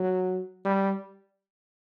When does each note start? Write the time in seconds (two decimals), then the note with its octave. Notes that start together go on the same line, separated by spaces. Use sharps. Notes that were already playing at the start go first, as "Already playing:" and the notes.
Already playing: F#3
0.65 G3